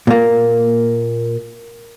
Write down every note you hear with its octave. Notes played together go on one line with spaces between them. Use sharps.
A#2 A#3